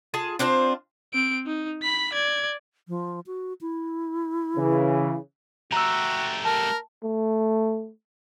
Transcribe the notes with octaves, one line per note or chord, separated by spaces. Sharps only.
F4 G#4 A5
C4 D4 F4 C5
C4 D7
D#4
B5 B6
D5 G#6
F3
F#4
E4
C#3 E3
A3 F#4 G4 A#5 E6
A#4 A5
A3